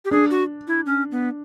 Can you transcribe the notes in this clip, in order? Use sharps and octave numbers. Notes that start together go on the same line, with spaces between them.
G4
D4 G#4
F#4
E4
C#4
B3